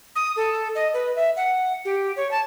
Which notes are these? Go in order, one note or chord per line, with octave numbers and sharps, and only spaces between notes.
D#6
A4
D#5
B4
E5
F#5
G4
C#5
A5